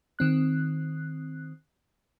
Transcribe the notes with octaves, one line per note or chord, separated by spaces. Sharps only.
D#3 C4 F#6